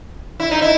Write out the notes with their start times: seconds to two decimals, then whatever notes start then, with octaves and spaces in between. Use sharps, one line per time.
0.40 E4
0.51 D#4
0.62 E4